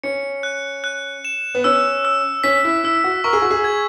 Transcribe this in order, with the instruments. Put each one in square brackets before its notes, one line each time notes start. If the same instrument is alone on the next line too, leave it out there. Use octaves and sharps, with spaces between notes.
[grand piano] C#4 [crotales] C#7
[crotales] F#6
F#6
E7
[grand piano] B3
[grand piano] C#4 [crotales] E6
[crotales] E6
[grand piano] C#4 [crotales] B6
[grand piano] E4
[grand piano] E4 [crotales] E6
[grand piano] F#4
[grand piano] A#4 [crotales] C#6
[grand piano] G#4
F#4
G#4
[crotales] G#6